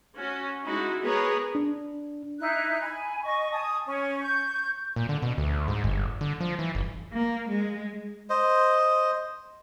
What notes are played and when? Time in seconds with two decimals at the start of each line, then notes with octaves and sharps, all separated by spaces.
0.17 C#4 F#4
0.65 G#3 D#4 E4 F#4
1.02 B3 G#4 A#4 B4 C#5
1.55 D4
2.39 D#4 E4 F#6
2.82 G#5 B5
3.23 D#5 C#6
3.51 G#5 A5 D#6
3.87 C#4
4.21 C#6 G6
4.96 A#2
5.09 D3
5.22 B2
5.38 D2
5.68 G#2
5.84 G1
6.21 D3
6.41 F3
6.59 E3
6.75 F#1
7.12 A#3
7.49 G#3
8.30 C5 D#5